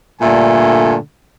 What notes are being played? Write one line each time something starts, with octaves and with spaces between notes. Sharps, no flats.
G2 A#2 D3 A3 G#5